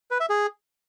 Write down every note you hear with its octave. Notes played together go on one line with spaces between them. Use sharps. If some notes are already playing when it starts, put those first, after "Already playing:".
B4
E5
G#4